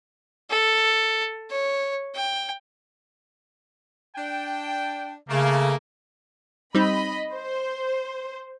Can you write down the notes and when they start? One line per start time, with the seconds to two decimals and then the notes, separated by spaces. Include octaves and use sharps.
0.50 A4
1.50 C#5
2.15 G5
4.16 D4 G5
5.29 C#3 A3 A#3
6.75 G3 C4 D#4 D#5 B5
7.33 C5